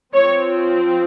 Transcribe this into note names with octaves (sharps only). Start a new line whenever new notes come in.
F3 C4 C#5